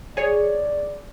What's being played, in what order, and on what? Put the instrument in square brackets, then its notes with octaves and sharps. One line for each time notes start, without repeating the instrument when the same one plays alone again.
[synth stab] G#4 C#5 [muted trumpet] D5